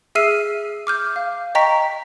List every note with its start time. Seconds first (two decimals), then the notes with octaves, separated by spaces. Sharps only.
0.15 G#4 E5 E6 F6 C7 D#7
0.87 D6 F6 G6
1.16 F5
1.55 D#5 G5 A#5 C#6 B6